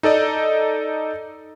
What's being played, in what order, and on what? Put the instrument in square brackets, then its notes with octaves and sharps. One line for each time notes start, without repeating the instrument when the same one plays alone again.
[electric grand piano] D#4 A4 D5 D#5